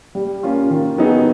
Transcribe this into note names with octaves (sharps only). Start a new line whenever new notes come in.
G3
A#3 C#4 F4
D#3
F#3 B3 D#4 G#4